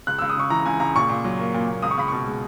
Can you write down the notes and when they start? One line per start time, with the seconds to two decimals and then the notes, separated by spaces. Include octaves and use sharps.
0.07 C#2 F#6
0.19 C#2 E6
0.29 D#6
0.36 C#3 C#6
0.50 E3 A#5
0.65 C#2 G#5
0.80 C#2 A#5
0.96 A#2 C#6
1.09 A#2
1.24 F#3
1.39 A#3
1.54 A#2
1.68 A#2
1.82 C#2 D#6
1.91 C#6
1.98 C#2 B5
2.08 B2 C#6
2.27 G#3